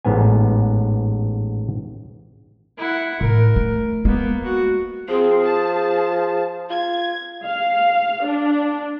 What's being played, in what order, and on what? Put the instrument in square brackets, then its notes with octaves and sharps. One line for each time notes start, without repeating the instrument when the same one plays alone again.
[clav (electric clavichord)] A1 G#2 B3 G#5
[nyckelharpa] E4 F#5
[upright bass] A2 [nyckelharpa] A#4
[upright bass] A3
[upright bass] G#3 [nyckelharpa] A#3 B3
[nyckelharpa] F#4
[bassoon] F3 [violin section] C4 [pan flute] G#4
[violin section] A5
[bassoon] F4 [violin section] G#6
[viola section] F5
D4